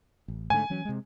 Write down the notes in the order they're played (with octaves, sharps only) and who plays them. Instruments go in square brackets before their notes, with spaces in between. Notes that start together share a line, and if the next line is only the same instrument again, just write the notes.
[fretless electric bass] A1
[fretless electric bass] G#2 D3 A3 [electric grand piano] G#5
[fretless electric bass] E3 F#3 C#4
C3 G#3